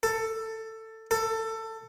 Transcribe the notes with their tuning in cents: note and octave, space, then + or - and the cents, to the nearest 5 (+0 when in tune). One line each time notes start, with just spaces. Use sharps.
A4 +15
A4 +20